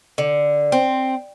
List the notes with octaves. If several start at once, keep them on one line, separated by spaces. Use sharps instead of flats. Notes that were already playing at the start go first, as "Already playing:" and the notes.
D3
C4